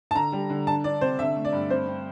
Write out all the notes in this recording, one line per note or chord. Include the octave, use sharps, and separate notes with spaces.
A5
D3 A#5
G3
D3
D4 A5
D4 D5
C3 C5
D3 E5
A3
D5
G2
C4 C5
C4